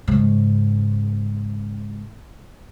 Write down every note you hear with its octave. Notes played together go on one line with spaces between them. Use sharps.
G#2 C#3